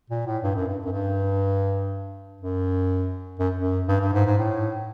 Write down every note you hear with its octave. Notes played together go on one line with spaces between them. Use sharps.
A#2
A2
G2
F#2
G2
F#2
G2
F#2
F#2
F#2
G2
G2
G#2
G#2
A2